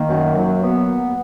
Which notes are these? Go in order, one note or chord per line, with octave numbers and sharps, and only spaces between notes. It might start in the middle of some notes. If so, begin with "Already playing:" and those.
Already playing: D#3 A#3
F#2
F#3
B3